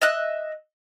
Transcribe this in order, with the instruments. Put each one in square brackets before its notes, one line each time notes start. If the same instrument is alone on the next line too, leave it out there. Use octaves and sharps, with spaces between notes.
[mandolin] D#5 E5 F#6